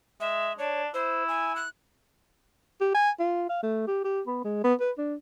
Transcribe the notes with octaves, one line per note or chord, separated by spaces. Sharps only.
G#3 E5
D4 C#5
E4 C5
G#5
F#6
G4
G#5
F4
F5
A3
G4
G4
B3
G#3
B3
B4
D4